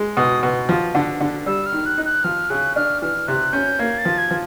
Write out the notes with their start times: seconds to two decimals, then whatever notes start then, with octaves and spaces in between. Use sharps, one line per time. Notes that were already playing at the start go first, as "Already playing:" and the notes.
Already playing: G#3
0.17 B2 D#6
0.43 B2
0.69 F3
0.95 D3
1.20 D3
1.46 G3 E6
1.66 F6
1.72 D#3
1.86 F#6
1.98 D#4
2.05 F#6
2.24 F3 F6
2.50 C#3 F#6
2.76 D4 F6
3.02 E3 F6
3.27 C3 F#6
3.53 C#4 G6
3.79 A#3 G#6
3.98 A6
4.05 F3
4.18 G#6
4.31 F3